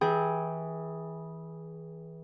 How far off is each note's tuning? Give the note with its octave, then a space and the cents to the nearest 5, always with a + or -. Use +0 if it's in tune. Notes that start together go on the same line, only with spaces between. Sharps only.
E3 -20 G#4 +0 G5 +0